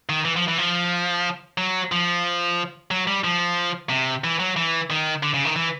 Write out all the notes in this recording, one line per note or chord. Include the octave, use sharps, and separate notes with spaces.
D#3
E3
F3
E3
F3
F#3
F3
F#3
G3
F3
C3
E3
F#3
E3
D#3
D3
C#3
D#3
E3